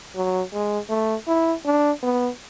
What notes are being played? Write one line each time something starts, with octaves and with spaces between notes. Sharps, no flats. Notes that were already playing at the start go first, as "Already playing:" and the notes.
F#3
G#3
A3
E4
D4
B3